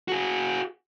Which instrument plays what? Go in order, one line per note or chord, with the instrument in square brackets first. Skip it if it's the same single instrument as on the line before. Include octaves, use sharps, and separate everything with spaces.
[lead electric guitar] F#4 G#4